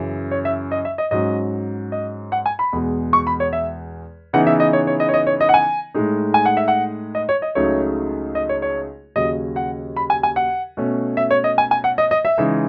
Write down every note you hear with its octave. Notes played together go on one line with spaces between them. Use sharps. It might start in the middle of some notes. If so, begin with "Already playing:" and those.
Already playing: F#2 C#3 E3
C#5
E5
D#5
E5
D#5
G#2 F#3 C#4 D#5
D#5
F#5
G#5
B5
E2 B2 G#3
C#6
B5
C#5
E5
C#3 E3 B3 D#4 F#5
E5
D#5
C#5
C#5
D#5
C#5
D#5
C#5
D#5
F#5
G#5
A2 G#3 D#4
G#5
F#5
E5
F#5
D#5
C#5
D#5
C#2 C#3 F#3 A3 D#4 C#5
D#5
C#5
C#5
D#2 C#3 F#3 D#5
F#5
B5
G#5
G#5
F#5
B2 A3 C#4
E5
C#5
D#5
G#5
G#5
F#5
D#5
D#5
E5
C#3 E3 G#3 D#4